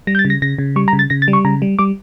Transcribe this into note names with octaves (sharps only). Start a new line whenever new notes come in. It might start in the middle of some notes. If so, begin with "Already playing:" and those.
G3 A#6
G6
A6
C#3
A#6
C#3 A#6
C#3
G3 C#6
A#5
C#3
A6
C#3 A#6
A6
G3
C#6
C#3 A#5
G3
G3 D6